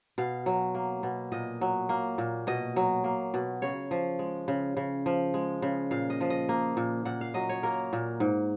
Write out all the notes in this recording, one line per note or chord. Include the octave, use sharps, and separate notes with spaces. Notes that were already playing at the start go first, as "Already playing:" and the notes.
B2 F5
F#3
A#3
B2
A#2 D#5
F#3
A#3
A#2
B2 D#5
F#3
A#3
B2
C#3 C#5
F3
G#3
C#3
C#3
F3
G#3
C#3
A#2 F5
D#5
F3
D#5
A#3
A#2
A#2 F#5
F5
F#3 D#5
C#5
A#3 A#4
A#2
G#2